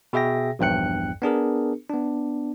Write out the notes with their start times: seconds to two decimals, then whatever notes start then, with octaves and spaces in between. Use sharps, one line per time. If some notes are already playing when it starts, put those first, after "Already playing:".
0.13 B2 G#4 E5 G5 A#6
0.59 A#1 E2 G2 G5 F#6 C#7
1.22 B3 D4 G#4 A#4
1.89 B3 D4